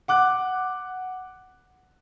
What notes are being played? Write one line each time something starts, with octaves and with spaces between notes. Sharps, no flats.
F#5 D6 F#6